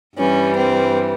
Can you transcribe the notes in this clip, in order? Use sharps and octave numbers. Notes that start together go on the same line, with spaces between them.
G2 E3 G3 C#4
C4